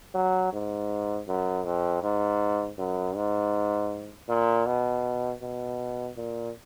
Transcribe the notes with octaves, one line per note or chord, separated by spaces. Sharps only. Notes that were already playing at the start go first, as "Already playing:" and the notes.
F#3
G#2
F#2
F2
G#2
F#2
G#2
A#2
B2
B2
A#2